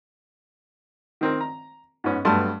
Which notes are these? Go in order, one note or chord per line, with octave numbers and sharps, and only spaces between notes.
D#3 C4 A#4
A#5
G#2 B3 C#4
G2 F#3 A3 B3 A5 C6